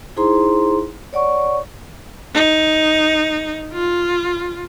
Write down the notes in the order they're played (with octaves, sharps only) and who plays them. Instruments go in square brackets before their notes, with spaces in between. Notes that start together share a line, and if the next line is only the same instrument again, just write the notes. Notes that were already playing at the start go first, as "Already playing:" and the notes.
[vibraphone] D#4 E4 G#4 C5 A#5 C6
C#5 D5 F#5 C#6
[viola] D#4
F4